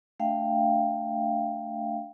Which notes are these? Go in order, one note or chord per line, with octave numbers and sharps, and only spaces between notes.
A3 D4 E5 F5 G5